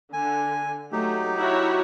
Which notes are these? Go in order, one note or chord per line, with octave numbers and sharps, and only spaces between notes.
D3 G#5
F#3 A3 D#4 G4
E4 F#4 C#5